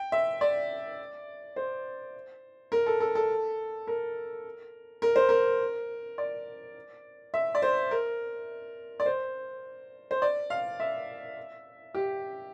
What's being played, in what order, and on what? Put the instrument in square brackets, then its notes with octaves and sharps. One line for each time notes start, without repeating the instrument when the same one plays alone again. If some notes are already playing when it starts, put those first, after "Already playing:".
Already playing: [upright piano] G5
E5
D5
C5
A#4
A4
A4
A4
A#4
A#4
C5
A#4
D5
E5
D5
C5
A#4
D5
C5
C5
D5
F5
E5
G4